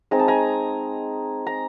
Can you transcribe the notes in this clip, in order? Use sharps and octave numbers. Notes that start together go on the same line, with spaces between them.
G#3 C4 D#4 A#5
A5
G#5 A#5
A#5